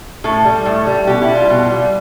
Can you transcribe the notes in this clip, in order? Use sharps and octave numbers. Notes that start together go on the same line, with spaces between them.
A2 A4
G3
A2
G3
B2 G4
E4
G3
F4
B2
G3